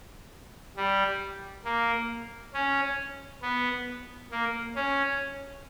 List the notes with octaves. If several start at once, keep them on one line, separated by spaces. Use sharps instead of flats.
G3
A#3
C#4
B3
A#3
C#4